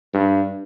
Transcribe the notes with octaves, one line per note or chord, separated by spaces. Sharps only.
G2